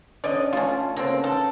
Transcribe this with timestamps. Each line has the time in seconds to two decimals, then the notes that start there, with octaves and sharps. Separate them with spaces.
0.24 D3 C#4 D5 D#5
0.53 A3 C#4 F4
0.96 C#3 A#3 C4 A4 B4
1.24 D#4 A4